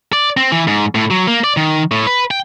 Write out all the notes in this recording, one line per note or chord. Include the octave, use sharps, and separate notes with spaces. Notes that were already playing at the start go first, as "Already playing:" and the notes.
D5
C4
E3
G#2
A2
F#3
A#3
D5
D#3
A2
B4
G5